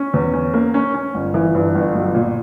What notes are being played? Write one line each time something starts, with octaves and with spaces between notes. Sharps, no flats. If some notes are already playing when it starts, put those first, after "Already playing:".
Already playing: C#4
E2
C#4
A#3
C#4
C#4
G1
E3
G2
G1
B1
A#2